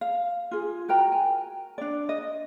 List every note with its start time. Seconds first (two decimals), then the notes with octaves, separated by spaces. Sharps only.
0.01 F5
0.51 F4 G#4
0.88 F#4 A#4 G5 A#5
1.12 G#5
1.78 D4 D5
2.09 D#5